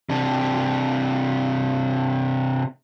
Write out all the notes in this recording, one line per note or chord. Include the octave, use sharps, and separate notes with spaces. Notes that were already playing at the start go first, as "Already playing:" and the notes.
C3 D4